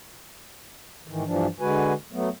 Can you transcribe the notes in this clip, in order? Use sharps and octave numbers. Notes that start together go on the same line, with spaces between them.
G#2 D#3 E3
G2 E3 F3 D4
D3 G#3 F#4 B4 G#5
F#3 A3 B3